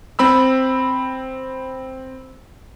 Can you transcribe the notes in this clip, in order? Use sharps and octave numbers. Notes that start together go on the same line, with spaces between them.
C4 B5 E6